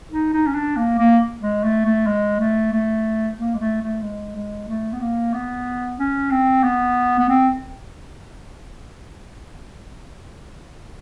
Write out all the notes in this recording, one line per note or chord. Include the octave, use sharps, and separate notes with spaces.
D#4
D#4
C#4
D4
A#3
A#3
G#3
A3
A3
G#3
A3
A3
A#3
G#3
A3
A3
G#3
G#3
A3
B3
A#3
B3
C#4
C4
B3
B3
C4